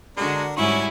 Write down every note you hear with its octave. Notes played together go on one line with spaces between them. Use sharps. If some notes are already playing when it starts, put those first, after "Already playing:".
D3 G#3 D4 F#4 A#4
G#2 G3 C#4 E4 F#4 C#5 G#5